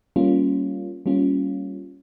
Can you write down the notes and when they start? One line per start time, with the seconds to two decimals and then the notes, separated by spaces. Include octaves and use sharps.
0.16 G3 A#3 C#4 F4
1.06 G3 A#3 C#4 F4